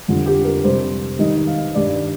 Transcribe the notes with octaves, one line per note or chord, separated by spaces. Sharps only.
F2 D3 G3 F4
G4
A#4
C3 G3 C5
G#2 D#3 G3 D#5
F5
G2 D#3 G3 D5